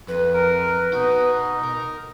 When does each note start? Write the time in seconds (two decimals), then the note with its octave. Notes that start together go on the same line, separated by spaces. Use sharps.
0.08 F2 B4
0.34 A#4
0.93 B2 D#4 F#4
1.64 A#4